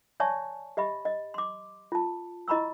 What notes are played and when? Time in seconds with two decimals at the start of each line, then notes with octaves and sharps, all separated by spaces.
0.20 C#5 D5 E5 G#5 A5 C#6
0.77 G4 D#5 E5 B5
1.05 D#5
1.34 C6 D6
1.92 F4 A5
2.48 E4 D#5 A#5 B5 C#6 E6